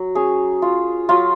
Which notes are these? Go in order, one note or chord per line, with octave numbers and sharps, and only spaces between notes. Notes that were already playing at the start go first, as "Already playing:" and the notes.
Already playing: F#3
C#4 G#4
F4
F#3 F4